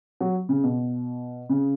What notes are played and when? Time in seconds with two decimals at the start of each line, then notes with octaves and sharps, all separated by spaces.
0.21 F#3
0.49 C#3
0.64 B2
1.49 C#3